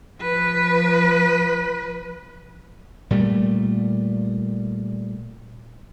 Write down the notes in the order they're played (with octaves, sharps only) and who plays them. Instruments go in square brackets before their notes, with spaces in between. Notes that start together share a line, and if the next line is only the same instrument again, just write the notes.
[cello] F3 B4
[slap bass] A#2 G3 A3